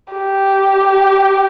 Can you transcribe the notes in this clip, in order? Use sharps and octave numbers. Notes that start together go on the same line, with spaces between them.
G4